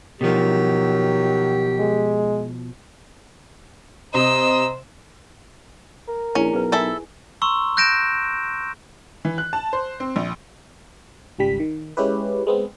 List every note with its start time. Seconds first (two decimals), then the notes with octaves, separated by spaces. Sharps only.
0.21 B2 D#3 F3 F#3 G4
1.79 G#3
4.14 C3 C5 D#5 A#5 E6
6.08 A#4
6.35 A#1 C#4 E4 G#4 D5
6.53 B1 G#4 B4
6.72 D#4 E4 A4 E5 G#5
7.42 A#5 C6 C#6 E6
7.77 F#6 G6 A#6 D7 E7
9.25 E3
9.38 F#6
9.53 A5
9.73 C5
10.00 C4
10.16 A#1
11.39 G#1 C#2 G3 B6
11.60 D#3
11.97 G#3 C#4 E4 G4 B4
12.47 G#3 B3 C4